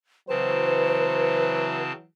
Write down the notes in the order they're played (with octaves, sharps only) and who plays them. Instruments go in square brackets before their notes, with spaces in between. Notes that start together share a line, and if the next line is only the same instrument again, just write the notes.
[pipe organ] C#3 C4 A5 [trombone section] E3 F#3 [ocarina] B4 [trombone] C5